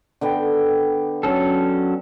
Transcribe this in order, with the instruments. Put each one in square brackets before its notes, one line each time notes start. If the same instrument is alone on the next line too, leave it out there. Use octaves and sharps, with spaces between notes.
[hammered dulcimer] D3 B3 G5
[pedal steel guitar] F#3 C#4 A4